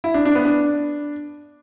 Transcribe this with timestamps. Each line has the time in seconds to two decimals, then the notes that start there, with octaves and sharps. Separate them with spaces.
0.04 E4
0.14 D4
0.25 D4
0.35 B3
0.45 D4